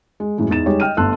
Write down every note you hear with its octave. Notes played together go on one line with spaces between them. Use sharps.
G#3
F#2 A2 E3 G#3
E2 D#4 A6 E7
G3 G#3 D#4 G4 C#5
D#5 G5 F6 D#7
G1 A3 A5 C6 E6 F#6